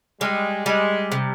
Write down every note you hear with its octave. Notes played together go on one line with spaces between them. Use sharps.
G3 G#3
G3 G#3
C3